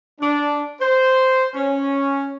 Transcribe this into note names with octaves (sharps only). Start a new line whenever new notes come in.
D4
C5
C#4